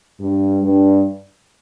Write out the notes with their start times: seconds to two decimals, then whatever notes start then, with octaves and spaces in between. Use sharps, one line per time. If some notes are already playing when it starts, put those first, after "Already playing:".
0.20 G2
0.63 G2